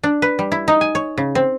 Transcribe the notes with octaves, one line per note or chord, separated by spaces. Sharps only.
D4
B4
G3
E4
D#4
G#5
C#5
C#3
C4